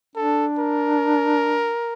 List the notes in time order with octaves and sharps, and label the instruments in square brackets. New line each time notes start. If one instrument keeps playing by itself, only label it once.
[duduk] D4 [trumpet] A4
[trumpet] A#4